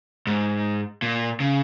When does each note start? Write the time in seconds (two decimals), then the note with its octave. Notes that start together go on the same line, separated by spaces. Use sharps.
0.27 G#2
1.02 A#2
1.40 C#3